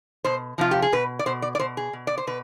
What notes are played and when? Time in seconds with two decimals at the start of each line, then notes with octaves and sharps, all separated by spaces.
0.24 B2 C5
0.58 C3 F3 F4
0.71 G4
0.82 G#4
0.92 B2 B4
1.19 D5
1.26 B2 C5
1.42 D5
1.55 D5
1.59 B2 C5
1.77 G#4
1.93 B2
2.07 D5
2.18 C5
2.27 B2 B4